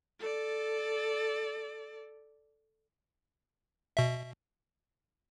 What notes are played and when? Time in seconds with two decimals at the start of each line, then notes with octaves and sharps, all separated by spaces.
0.20 A4 D5
3.97 B2 E5